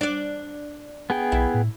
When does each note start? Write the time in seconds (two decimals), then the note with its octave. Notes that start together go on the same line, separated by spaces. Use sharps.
0.01 D4 D5
1.10 B3 G#4 G5
1.32 B1 E4
1.54 A2